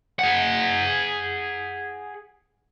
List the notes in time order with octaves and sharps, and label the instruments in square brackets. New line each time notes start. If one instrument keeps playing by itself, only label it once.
[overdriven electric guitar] G#4 F#5